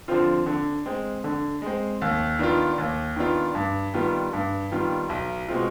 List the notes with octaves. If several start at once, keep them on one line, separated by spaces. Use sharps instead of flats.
D3 F3 C4 F4
D3
G#3 C4
D3
G#3 C4
D#2
D#3 B3 D4 F4
D#2
D#3 B3 D4 F4
G2
D#3 G3 B3 F4
G2
D#3 G3 B3 F4
B1
B2 G#3 C4 F4